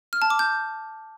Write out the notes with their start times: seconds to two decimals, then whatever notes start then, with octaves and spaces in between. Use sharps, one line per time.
0.13 F6
0.22 A5
0.30 D6
0.39 G6